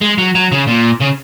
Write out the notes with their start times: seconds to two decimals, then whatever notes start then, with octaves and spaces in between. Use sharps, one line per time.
0.01 G#3
0.18 F#3
0.35 F#3
0.52 C#3
0.67 A#2
1.00 C#3